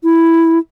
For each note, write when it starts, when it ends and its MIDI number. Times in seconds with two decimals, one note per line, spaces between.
0.04 0.58 64